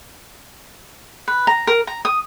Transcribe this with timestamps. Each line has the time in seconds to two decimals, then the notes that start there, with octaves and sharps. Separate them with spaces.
1.28 B4
1.47 A#5
1.67 A#4
1.87 A#5
2.05 D#6